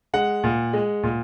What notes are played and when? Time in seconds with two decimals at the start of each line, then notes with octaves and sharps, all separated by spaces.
0.14 G#3 F#5
0.44 A#2
0.73 G#3
1.03 A#2